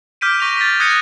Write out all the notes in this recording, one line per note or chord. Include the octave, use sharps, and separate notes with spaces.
D6 F6 G6 B6 D7 D#7
C#6 A#6 B6 D#7 F7 G7
A6 B6
D#6 F#6 G#6 A#6 C#7 D#7